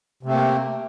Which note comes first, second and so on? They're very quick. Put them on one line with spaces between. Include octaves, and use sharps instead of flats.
C3 A3 C4 A#3